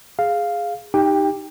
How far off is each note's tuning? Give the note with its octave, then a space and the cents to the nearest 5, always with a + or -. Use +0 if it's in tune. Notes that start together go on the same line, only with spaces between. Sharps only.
G#4 +0 F5 +0
D#4 +0 G4 +0 G5 +25